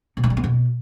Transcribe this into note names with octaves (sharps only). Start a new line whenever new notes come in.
B2
D#3
G3
B3
B2